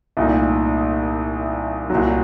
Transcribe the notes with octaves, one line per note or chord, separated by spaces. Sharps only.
C2 A#2 A3 D#4
C2 A#2 F#3